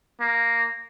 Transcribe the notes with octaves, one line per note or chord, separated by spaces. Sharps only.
A#3